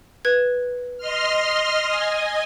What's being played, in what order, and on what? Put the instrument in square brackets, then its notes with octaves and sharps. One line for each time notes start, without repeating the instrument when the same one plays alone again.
[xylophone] B4 G#6
[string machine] D#5 C6 F6
D#5 G#5